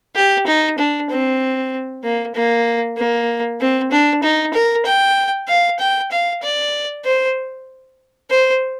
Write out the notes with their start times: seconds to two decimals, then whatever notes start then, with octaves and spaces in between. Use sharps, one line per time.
0.15 G4
0.46 D#4
0.77 D4
1.09 C4
2.03 A#3
2.34 A#3
2.97 A#3
3.60 C4
3.91 D4
4.23 D#4
4.54 A#4
4.85 G5
5.48 F5
5.79 G5
6.11 F5
6.42 D5
7.05 C5
8.30 C5